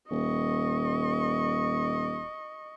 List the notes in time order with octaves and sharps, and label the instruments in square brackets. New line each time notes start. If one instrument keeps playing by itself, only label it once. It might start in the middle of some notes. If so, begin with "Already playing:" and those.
[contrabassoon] D#1 [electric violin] D#5 C#6